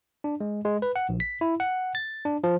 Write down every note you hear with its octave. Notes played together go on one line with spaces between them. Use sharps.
D4
G#3
G#3
B4
F#5
A#1
B6
E4
F#5
A6
D4
F3